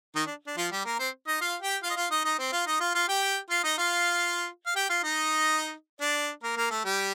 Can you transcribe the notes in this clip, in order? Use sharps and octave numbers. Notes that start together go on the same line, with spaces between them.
D#3 D#4
D4
D4
F3 F4
G3 G4
A#3 A#4
C4 C5
D#4 D#5
F4 F5
G4 G5
F4 F5
D#5
F4 F5
D#4 D#5
D#4 D#5
C4 C5
F4 F5
D#4 D#5
F4 F5
F4 F5
G4 G5
F4 F5
D#4 D#5
F4 F5
F5
G4 G5
F4 F5
D#4 D#5
D4 D5
A#3 A#4
A#3 A#4
A3 A4
G3 G4